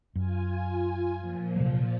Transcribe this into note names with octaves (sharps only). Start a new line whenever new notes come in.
F#2 F4 G#5
A#2 F3
C3 F#3